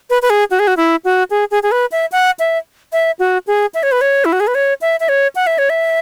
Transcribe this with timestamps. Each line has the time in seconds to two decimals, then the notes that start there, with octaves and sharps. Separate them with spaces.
0.10 B4
0.22 B4
0.30 G#4
0.51 F#4
0.59 G#4
0.67 F#4
0.77 E4
1.05 F#4
1.30 G#4
1.51 G#4
1.63 G#4
1.72 B4
1.92 E5
2.12 F#5
2.39 E5
2.92 E5
3.19 F#4
3.47 G#4
3.74 E5
3.83 C#5
3.92 B4
4.01 C#5
4.25 E4
4.33 F#4
4.40 G#4
4.47 B4
4.55 C#5
4.81 E5
5.00 E5
5.09 C#5
5.35 F#5
5.47 E5
5.58 C#5
5.70 E5